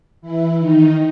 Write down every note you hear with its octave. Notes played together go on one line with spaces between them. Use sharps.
E3 E4
D#3 D#4